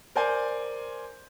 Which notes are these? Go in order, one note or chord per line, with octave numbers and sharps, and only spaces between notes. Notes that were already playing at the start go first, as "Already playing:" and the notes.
A#4 C5 D5 G#5 C6 G6